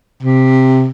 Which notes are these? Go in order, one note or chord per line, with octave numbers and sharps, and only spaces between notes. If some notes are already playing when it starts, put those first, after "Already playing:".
C3